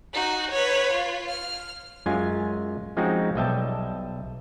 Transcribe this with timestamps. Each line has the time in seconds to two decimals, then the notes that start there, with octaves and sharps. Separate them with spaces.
0.13 D#4 F#4
0.50 B4 C#5
0.92 F4
1.29 F6
2.06 F#2 G#3 C#4 F4 G#5
2.97 F3 G#3 C4 C#4 D#4 F#4
3.35 B1 G3 D#5 E5 G5 A5